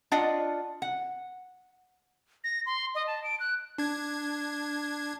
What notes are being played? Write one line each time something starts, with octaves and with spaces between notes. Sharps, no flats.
D4 F4 D5 D#5 F#5
F#5
A#6
C6
D#5
A5
D7
F#6
D4 G#6